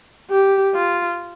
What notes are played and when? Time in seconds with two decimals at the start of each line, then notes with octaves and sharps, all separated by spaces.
0.31 G4
0.75 F4